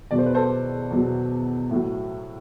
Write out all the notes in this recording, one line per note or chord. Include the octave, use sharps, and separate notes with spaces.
E2 B2 F#3 D5
C5
B4
A4 C5
E2 B2 F#3
A2 F#3